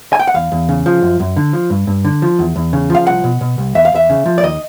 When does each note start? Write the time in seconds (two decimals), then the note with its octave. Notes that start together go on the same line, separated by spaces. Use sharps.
0.13 G#5
0.19 G5
0.27 F#5
0.34 E2 F5
0.52 E2
0.69 C#3
0.86 F3
1.02 F#2
1.20 F#2
1.37 D3
1.53 F3
1.70 G2
1.87 G2
2.05 D3
2.22 F3
2.39 E2
2.56 E2
2.73 C#3
2.90 F3 F5
3.07 C2 F#5
3.24 B2
3.41 B2
3.58 C2
3.75 E2 E5
3.85 F5
3.92 E2 E5
4.10 C#3
4.26 F3
4.38 D5
4.43 D#2 D#5